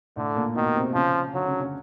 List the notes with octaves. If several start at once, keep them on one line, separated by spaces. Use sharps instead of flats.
A2 D3 A3
A#2 A#3
B2 D#3 B3
C3 C4
C#3 F3 C#4
D3 F#3 D4
C#3 C#4
C#3 C#4